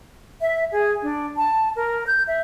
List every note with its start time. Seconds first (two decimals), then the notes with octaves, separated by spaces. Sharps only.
0.40 E5
0.72 G#4
1.02 D4
1.36 A5
1.75 A#4
2.06 G6
2.27 E5